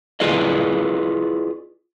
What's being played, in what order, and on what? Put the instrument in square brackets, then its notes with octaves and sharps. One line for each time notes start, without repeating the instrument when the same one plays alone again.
[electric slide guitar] E4 F4 G#4 B4 D5 D#5